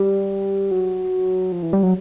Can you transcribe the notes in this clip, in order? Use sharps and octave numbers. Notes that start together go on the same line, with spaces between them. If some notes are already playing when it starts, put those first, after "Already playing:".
Already playing: G3
F#3
F3
E3
G3
F#3